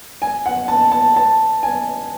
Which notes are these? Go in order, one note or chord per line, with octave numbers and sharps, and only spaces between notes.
G#5
F#5
A5
A5
A5
G#5